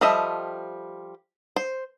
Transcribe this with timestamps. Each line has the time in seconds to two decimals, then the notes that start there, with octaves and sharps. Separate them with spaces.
0.01 F3 G3 A4 D#5 E5
1.56 C5